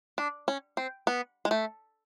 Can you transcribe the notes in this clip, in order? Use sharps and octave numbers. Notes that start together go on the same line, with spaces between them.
D4
C#4
C4
B3
G#3
A3